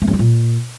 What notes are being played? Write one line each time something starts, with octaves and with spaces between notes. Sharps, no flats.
A3
G2
G3
A#2